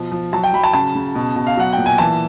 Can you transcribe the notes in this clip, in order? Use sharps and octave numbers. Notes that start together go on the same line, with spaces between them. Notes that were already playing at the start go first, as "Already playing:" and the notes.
Already playing: B2 F3
F3
F#3 A5
G5
F#3 B5
A5
C#3 A5
C#3
B2
B2
F5
F#3 F#5
A#2 G5
G#5
E3 A5